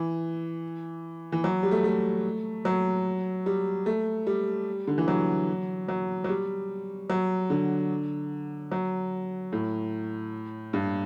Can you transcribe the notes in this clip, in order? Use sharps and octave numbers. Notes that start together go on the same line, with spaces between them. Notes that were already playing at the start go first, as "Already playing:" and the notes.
Already playing: E3
E3
F#3
G3
A3
A3
F#3
G3
A3
G3
D3
E3
F#3
F#3
F#3
G3
F#3
D3
F#3
A2
G2